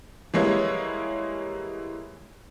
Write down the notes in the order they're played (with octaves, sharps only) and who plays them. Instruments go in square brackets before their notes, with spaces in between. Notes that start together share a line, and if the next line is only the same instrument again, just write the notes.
[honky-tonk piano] E3 G3 G#3 A#3 E4 C#5